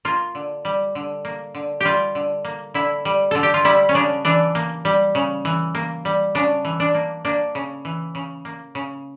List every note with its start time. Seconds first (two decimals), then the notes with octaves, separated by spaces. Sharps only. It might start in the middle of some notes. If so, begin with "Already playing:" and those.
0.05 A#3 F4
0.35 D3
0.65 G3
0.95 D3
1.25 A#3
1.55 D3
1.80 G3 F4 G4
2.15 D3
2.45 A#3
2.74 D3 E4
3.05 G3
3.31 D3 A4
3.43 G4
3.54 F4
3.65 G3 E4
3.89 C#4
3.94 C#3 D4
4.25 E3 D4
4.55 A#3
4.85 G3
5.15 C#3
5.45 E3
5.75 A#3
6.05 G3
6.35 C#3 D4
6.65 E3
6.80 D4
6.95 A#3
7.25 A#3 D4
7.55 C#3
7.85 E3
8.15 C#3
8.45 A#3
8.75 C#3